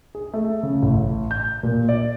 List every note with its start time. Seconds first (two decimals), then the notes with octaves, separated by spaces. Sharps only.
0.15 G#4
0.33 A3
0.63 C#3
0.83 A1
1.31 G6
1.63 A#2
1.89 D5